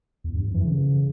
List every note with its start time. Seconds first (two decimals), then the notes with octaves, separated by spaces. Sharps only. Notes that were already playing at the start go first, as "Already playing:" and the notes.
0.24 E2
0.34 G2
0.44 F2
0.54 E3
0.65 C#3